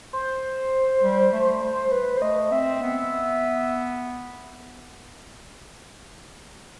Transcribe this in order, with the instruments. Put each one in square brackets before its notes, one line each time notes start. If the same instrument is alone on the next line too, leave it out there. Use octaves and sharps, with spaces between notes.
[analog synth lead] C5
[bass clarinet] G3
A3
A3
[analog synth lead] B4
C5
[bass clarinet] A3 [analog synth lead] D#5
[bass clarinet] C4 [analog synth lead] E5
[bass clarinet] B3